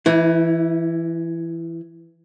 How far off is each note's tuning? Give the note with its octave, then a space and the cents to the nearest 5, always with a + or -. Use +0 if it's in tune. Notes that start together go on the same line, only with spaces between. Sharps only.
E3 +15 E4 -30